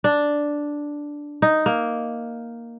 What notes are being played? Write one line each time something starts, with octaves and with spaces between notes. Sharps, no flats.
D4
D#4
A#3